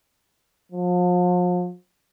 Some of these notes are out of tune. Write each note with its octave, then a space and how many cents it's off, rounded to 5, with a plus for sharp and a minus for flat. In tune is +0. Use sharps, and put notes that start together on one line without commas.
F3 +40